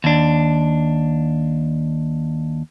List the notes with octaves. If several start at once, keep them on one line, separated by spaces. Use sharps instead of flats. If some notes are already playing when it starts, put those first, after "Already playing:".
D#2 D4